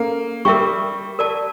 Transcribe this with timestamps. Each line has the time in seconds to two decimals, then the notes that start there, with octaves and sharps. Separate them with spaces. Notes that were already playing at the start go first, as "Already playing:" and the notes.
Already playing: A#3 C#4 A4
0.45 G3 A#4 E5 G5 C#6
1.19 A#4 D5 A5